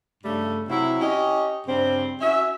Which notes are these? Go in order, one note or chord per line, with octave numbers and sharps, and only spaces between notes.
G2 C#3 G3 A3
C3 F#3 E4
C#4 G4 C#5 D#5
G2 C#3 G3 C4
C#4 F#4 E5